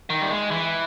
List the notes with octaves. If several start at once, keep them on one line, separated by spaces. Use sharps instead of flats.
D#3
G3
G#3
E3